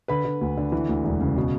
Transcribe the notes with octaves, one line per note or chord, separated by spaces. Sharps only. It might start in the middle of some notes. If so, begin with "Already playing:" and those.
D3 B4 B5
D3
D2
D3
E3
D2
E1
C#3
B2